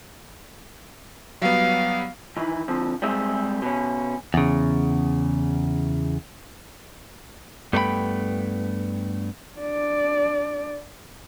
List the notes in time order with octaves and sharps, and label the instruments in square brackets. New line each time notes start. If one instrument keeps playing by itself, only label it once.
[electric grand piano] F#3 G3 B3 [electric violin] F5
[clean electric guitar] D#3 E3 E4
D3 F3 C4
G3 G#3 C4 G#4 E5
B2 C#4
E2 C#3
G2 A3 B3 A4 G5 B5
[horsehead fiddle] D4 D5